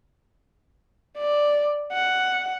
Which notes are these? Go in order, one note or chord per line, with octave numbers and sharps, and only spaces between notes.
D5
F#5